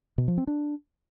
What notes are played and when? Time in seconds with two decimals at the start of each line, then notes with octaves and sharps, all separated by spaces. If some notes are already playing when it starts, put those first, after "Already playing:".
0.18 B2
0.28 F3
0.38 C4
0.47 D4